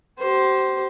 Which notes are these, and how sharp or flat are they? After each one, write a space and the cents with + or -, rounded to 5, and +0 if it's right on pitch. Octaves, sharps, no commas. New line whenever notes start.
G4 -40 C5 +0